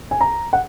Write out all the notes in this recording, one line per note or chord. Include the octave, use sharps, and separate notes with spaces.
G#5
A#5
F#5